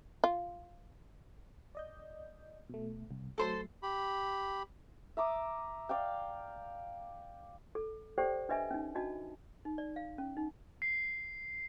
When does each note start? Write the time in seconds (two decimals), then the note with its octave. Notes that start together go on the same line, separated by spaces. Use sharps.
0.24 F4
1.75 D5 D#5 G6
2.69 B2 A3
3.11 C2
3.38 F#3 A3 A4 C5 C6
3.83 G4 B5
5.17 E5 A#5 D6 D#6
5.89 D5 F5 G5
7.75 A4
8.18 G4 A4 C5 D5 G5
8.49 D4 B4 D#5 E5 G#5
8.71 C#4 D#4
8.95 D4 F#4 D#5 A5
9.65 D#4
9.78 D5
9.96 F5
10.18 C#4
10.37 D#4
10.82 C7